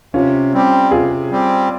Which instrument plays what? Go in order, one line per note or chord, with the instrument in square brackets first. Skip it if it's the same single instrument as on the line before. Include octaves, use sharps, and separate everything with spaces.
[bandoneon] C3 [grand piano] C#4 F4
[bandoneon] G3 C4 G4
[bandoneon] C3 [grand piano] F4 G#4
[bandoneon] G3 C4 G4